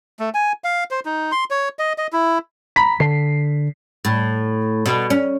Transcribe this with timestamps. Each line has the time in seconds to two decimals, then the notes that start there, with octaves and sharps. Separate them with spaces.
0.19 A3
0.34 G#5
0.64 F5
0.91 C5
1.05 D#4
1.32 C6
1.50 C#5
1.79 D#5
1.98 D#5
2.13 E4
2.76 A#5 B5 B6
3.00 D3 C7
4.05 A2
4.86 B2
5.10 C#4